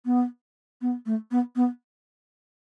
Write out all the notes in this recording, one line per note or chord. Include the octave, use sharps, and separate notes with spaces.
B3
B3
A3
B3
B3